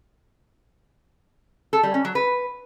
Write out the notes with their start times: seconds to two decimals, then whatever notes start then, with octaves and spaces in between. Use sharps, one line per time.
1.73 A4
1.83 G3
1.94 C#4
2.05 F#3
2.15 B4